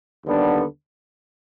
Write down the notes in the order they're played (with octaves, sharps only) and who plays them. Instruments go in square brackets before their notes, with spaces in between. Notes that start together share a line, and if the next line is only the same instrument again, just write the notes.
[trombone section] D#2 D3 G3 B3 D4